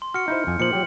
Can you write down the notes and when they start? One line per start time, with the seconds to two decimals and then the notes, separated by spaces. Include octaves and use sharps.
0.02 C6
0.14 F#4 F6 C#7
0.28 D#4 E4 C5 G6
0.47 F2 G#5
0.60 A#2 F3 C5 C#7 F#7
0.73 F#3 G4